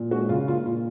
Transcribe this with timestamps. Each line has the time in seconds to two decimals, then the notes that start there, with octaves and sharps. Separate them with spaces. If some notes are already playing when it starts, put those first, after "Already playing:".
Already playing: A#2
0.11 G#3 F#4
0.29 C#3 F4
0.48 A#3 F4
0.66 A#2 F4